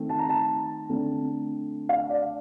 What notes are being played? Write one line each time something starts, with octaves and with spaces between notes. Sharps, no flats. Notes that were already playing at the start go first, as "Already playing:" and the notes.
Already playing: D#3 A3 C4
A5
A#5
A5
D3 A3 C4
F5
D5